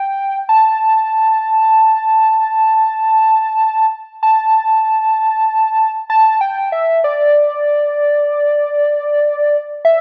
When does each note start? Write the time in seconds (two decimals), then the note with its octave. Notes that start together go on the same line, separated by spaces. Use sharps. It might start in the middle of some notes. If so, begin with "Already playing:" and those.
Already playing: G5
0.49 A5
4.23 A5
6.10 A5
6.41 G5
6.72 E5
7.04 D5
9.85 E5